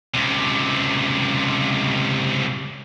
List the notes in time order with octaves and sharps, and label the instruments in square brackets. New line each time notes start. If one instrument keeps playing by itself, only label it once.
[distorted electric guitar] C#2 C3